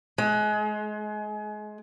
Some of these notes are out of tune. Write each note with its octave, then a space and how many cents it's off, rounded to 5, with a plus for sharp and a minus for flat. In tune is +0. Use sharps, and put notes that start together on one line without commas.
G#3 +30